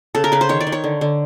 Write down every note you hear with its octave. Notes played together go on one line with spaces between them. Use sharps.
C#3 A4
A#4
C#3 B4
C5
D#3 C#5
D5
D#3
C#5
D3
D3